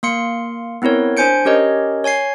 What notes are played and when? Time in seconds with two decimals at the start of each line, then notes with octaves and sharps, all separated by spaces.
0.03 A#3 F5 C6 C#7
0.82 B3 C4 E4 A#4 C#5
1.17 D4 C5 G#5 G6 C#7 D7
1.45 C#4 G4 A#4 C#5 D#5
2.04 C#5 G#5 G#6 C7